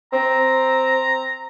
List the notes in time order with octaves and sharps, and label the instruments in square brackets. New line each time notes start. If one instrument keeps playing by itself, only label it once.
[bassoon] C4 [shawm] A#5